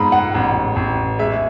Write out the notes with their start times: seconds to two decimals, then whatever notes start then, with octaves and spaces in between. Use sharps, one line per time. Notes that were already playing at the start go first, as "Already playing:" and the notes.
Already playing: G#2 B5 D#6
0.12 F#5
0.34 A1
0.76 A1
1.19 G#3 E5